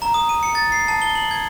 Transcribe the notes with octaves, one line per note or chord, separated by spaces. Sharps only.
A#5
D#6
D#7
C#7
A6
C7
A5
G7
F#7
G#6